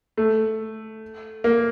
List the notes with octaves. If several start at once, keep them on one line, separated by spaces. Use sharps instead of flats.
A3
A#3